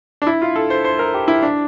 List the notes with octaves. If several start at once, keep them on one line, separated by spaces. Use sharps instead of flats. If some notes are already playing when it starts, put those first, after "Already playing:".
D4
E4
F4
A4
C5
C5
A#4
G4
E4
D4